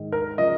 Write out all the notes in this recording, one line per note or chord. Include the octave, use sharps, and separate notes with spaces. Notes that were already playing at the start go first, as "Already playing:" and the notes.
Already playing: G#2 D#3
A#4
C#3 F3 D#5